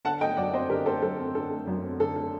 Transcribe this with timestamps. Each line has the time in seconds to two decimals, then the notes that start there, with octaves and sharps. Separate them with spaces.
0.05 D3 F#5 A5
0.21 A3 D#5 G5
0.37 F#2 D5 F#5
0.53 C4 C5 D#5
0.70 D3 G4 A#4
0.86 A3 A4 C5
1.02 F#2 A4
1.19 C4
1.35 D3 A4
1.51 A3
1.67 F#2
1.83 C4
2.00 D3 A4
2.16 A3 A4